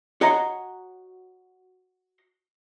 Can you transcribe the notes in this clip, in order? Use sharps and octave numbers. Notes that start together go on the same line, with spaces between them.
F#4 C#5 D#5 F#5 A#5 C6